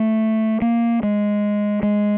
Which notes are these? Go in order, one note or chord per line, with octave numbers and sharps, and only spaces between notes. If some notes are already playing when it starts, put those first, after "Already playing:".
Already playing: A3
A#3
G#3
G#3